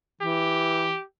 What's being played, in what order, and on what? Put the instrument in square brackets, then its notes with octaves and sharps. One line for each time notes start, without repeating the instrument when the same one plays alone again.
[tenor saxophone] E3 [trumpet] G4